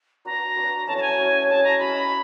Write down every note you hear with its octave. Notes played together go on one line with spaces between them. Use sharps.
D4 F#4 B4 A#5
D4 F#4 B4
F#3 A3 C#4 E4 A5
A5
G#5
F#3 A3 C#4 E4
G#3 C#4 F#4 A5
A#5
G#3 C#4 F#4 B5